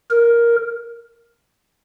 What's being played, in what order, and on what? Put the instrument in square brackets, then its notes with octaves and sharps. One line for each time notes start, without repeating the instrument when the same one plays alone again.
[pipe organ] A#4